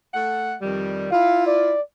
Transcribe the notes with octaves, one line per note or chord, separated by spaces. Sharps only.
A3 A4 F#5
F2 D#3 G3
E4 F4 F5
D5